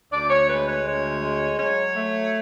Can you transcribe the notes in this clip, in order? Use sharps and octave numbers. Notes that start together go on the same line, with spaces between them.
D2 D5
C#5
G#3 B4
C#5
D2 C#5
G#3
F#3 C#5
A3